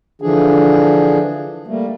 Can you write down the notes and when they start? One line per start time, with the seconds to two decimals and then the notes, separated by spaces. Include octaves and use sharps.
0.22 D3 E3 F3 D4 G#4
1.67 G3 A3 A#3